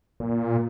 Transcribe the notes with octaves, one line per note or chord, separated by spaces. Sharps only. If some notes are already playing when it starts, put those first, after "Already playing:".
A#2